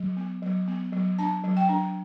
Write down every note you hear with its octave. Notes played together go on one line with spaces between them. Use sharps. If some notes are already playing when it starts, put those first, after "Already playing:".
Already playing: F#3
B3
F#3
B3
F#3
D4 A5
F#3
G5
D4